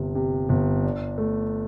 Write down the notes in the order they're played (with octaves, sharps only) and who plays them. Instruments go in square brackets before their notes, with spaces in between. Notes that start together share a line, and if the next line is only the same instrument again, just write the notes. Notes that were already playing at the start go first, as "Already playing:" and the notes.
Already playing: [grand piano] G1 C3
C3
G1
D4
A3